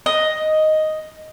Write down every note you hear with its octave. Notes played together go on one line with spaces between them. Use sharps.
D#5